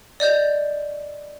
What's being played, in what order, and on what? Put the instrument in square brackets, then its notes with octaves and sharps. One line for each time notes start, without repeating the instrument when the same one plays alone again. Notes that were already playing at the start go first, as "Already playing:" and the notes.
[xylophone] D5 D#5 G6